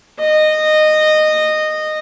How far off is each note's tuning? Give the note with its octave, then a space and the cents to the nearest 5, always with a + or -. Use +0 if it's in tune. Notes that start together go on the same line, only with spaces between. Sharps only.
D#5 -15